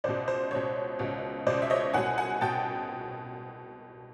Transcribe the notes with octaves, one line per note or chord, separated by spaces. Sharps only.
C#2 B2 C5 D5
C5
C#2 B2 C#5
C#2 B2
C#2 B2 C5 D5
E5
C#5 D#5
C2 B2 F#5 G#5
F#5 G#5
B2 G5 A5